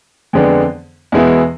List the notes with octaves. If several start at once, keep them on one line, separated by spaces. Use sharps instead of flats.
F2 D3 G#3 B3 D4
E2 B2 G#3 B3 E4